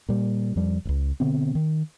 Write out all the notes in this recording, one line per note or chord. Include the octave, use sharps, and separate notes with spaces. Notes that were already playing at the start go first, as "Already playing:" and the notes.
A#2 G3
F2 F3 G3
D#1 C#2
B2 D3 B3 C4
D#3